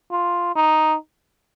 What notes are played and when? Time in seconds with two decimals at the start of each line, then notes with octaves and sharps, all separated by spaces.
0.11 F4
0.56 D#4